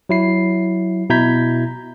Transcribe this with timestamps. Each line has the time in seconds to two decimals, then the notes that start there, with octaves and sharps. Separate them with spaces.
0.09 F#3 E4 C7
1.10 B2 E4 A#5 G6 G#6 B6